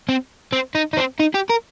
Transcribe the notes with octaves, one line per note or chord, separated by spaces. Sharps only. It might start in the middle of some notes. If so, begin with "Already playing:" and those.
C4
C4
D#4
D#4
C4
D#4
G4
A#4